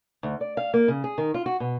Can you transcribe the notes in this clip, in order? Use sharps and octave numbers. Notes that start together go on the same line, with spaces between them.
D2
D5
F5
A#3
C#3
G#4
D#3
F4
F#4
B2